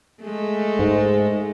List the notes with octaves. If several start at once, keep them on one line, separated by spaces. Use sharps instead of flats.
G#3 A3
G#2